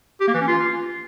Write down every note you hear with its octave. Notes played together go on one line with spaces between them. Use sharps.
G4
A#3
E3
C#4
F4